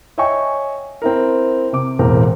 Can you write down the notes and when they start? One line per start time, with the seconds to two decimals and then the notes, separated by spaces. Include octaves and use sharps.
0.18 C#5 D#5 E5 G5 G#5 C#6
1.02 C4 E4 A#4
1.73 C3 D6
1.99 E1 E2 A2 C4 G#4 A#4